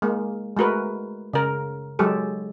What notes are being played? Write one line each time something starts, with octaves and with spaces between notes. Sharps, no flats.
G#3 A#3
G#3 A3 F#4 A#4 B4
C#3 A#4
F#3 G#3 G4 A4